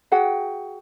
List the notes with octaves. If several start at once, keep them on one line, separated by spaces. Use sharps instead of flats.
F#4 G#4 F#5 G5